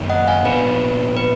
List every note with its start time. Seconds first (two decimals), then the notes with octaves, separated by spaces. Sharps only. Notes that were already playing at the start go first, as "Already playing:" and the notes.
Already playing: F#2 D#3 A#3 D#4
0.10 D#5 F#5
0.27 F5 G#5
0.45 A#2 F3 B3 D4 B4
1.17 B4